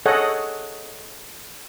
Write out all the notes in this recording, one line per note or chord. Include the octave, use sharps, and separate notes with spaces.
G#4 A4 C#5 D#5 F#5